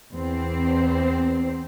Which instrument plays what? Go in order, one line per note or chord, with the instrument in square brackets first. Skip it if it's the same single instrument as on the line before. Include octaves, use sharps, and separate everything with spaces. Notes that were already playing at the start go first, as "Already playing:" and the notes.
[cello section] E2 C4 C5